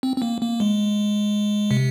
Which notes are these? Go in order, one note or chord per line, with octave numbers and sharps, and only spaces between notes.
C4
C4
A#3
A#3
G#3
C3